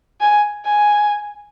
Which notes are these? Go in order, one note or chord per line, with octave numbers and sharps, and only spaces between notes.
G#5
G#5